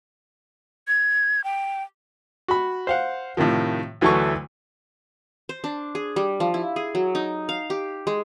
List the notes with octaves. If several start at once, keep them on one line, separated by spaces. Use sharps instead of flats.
G#6
G5
F#4 B5
C5 F5 F#5
A2 C3 D#3 F3
D2 E3 F#3 A3 A4 C#6
C5
D4
G#4
G3
F3
E4
G#4
F#3
D#4
F5
G4
G#3